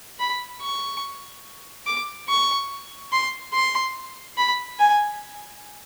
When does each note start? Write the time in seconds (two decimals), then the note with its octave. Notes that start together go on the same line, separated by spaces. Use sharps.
0.19 B5
0.61 C#6
1.86 D6
2.28 C#6
3.12 C6
3.53 C6
4.38 B5
4.79 G#5